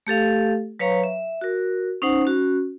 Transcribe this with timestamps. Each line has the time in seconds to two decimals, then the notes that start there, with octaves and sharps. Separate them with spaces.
0.07 A3 G4 A4 F5
0.79 F#3 B4 C#5 F5 A#5 C#6
1.03 E5
1.41 F#4 A#4
2.02 C#4 D#4 C5 F#5
2.25 C#4 F#4